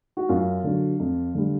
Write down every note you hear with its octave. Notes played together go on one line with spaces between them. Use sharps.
F#4
F#2 F4
D3 F#3
F2
D3 G3